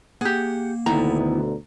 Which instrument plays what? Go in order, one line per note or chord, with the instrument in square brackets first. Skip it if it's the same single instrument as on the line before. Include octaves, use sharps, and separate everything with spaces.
[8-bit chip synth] A#3 [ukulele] G4 G#4 [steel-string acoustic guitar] F#5
[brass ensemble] D2 B2 D3 [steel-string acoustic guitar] D#3 B3 E4 [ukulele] A#5